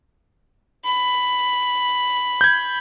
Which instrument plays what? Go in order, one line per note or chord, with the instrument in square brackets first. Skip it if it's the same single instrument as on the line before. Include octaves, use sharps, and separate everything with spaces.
[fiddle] B5
[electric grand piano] G6 G#6